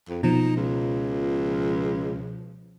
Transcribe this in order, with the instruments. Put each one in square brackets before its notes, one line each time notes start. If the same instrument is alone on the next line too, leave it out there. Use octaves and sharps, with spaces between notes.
[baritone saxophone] F2
[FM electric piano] B2 F3 [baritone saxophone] D#4
[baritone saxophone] C#2